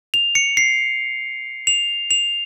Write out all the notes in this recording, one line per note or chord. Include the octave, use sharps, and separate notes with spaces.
F7
C#7
C7
F7
F7